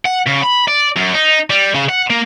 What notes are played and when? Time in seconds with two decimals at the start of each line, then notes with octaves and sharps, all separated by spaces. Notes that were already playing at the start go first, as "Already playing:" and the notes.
0.06 F#5
0.27 C#3
0.44 B5
0.68 D5
0.96 F#2
1.14 D#4
1.50 G3
1.74 C#3
1.89 F#5
2.10 A#3